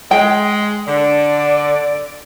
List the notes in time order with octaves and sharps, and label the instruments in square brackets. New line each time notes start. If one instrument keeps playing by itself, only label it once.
[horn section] G#3 [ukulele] G5
[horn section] D3 [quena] D5